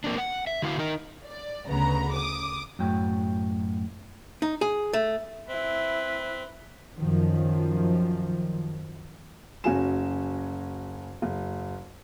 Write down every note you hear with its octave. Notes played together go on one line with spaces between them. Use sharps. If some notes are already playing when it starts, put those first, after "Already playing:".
A#3 C4 D4
F#5
E5
D3 E4 F#4 F5
D#4 A#4 D#5
D5
D2 C#3 B3 A#5
D6 D#6
F#2 A2 G5
D#4
G#4
A3
C4 E4 B4
F#2 D#3 F3
F#1 F#3 C#4 F#4 G#5 E7
F#1